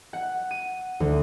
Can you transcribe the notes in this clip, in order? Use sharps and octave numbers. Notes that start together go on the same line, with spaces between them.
F#5
D#7
D2